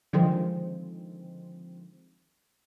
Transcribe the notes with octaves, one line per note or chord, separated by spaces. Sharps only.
D3 D#3 F3 G#3 C4